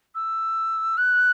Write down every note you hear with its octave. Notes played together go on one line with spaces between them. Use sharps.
E6
F#6